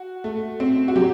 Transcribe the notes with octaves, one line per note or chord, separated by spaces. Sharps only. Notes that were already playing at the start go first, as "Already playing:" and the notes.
Already playing: F#4
A3
C4
F#4
F#3 G4